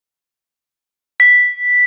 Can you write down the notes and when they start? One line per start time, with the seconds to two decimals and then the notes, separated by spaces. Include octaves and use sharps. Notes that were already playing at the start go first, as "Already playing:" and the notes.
1.20 B6